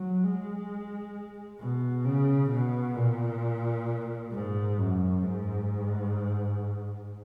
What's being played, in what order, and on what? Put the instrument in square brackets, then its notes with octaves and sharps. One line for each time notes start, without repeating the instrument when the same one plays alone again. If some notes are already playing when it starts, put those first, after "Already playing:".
Already playing: [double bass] F#3
G#3
B2
C#3
B2
A#2
G#2
F#2
G#2